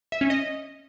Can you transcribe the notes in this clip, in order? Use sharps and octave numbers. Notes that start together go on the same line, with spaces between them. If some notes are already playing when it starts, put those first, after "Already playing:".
E5
C#4
D#5